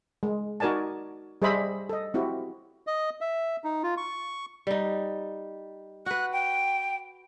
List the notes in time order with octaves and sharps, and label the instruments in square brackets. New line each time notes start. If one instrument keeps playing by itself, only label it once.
[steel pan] G#3
D#4 F#4 A#4 D5 G#5 A5
G3 G#4 C5 D#5 E5 B5
A4 D#5
C4 E4 F#4 G4
[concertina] D#5
E5
D#4
F4
C#6
[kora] G3 D#4
[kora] F#4 B4 [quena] F#6
[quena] G5